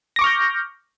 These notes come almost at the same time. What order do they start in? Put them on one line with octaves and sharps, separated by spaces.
A#6 D6 C#6 F6 G6